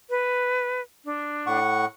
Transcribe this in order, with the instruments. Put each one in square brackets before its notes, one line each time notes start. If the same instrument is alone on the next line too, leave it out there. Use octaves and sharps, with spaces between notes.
[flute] B4
D4
[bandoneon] A2 F#5 C#6